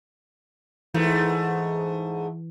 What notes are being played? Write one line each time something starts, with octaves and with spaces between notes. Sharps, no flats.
G#2 E3 A3